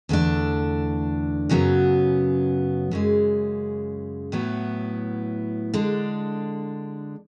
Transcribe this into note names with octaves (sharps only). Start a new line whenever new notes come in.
E2 D3 A3 D4
F#2 C#3 F#3 B3
F#2 C#3 G#3
A2 F#3 B3 E4
D3 G#3 D4